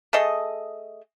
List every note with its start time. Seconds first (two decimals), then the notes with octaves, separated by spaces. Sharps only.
0.13 A3 G#4 A4 D#5